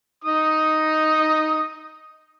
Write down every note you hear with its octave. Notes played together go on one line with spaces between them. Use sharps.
D#4 D#6